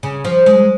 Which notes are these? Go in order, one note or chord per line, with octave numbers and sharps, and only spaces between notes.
C#3
F3
G#3